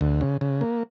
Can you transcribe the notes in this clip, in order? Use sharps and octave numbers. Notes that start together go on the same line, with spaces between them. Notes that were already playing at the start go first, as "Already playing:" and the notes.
D2
C#3
C#3
A#3